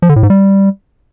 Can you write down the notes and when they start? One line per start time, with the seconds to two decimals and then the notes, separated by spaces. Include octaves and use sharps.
0.02 F3
0.09 D3
0.16 A2
0.23 G#2
0.30 G3